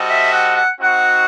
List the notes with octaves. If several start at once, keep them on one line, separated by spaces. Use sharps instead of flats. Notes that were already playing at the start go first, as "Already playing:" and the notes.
Already playing: G3 C4 F#4 A4 D#5
E5
F#5
F#5
C4 D#4 F#4 F#5